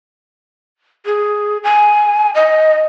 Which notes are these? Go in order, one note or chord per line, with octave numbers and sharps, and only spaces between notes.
G#4
G#5
D#5